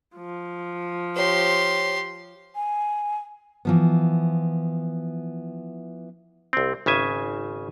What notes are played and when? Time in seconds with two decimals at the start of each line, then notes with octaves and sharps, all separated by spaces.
0.16 F3
1.16 G4 C5 C#5 C6
2.55 G#5
3.65 E3 F3 B3
6.53 C2 C4
6.86 G#1 C#3 E5 G#5